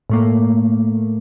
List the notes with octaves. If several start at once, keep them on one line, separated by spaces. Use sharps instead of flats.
A2 A3 A#3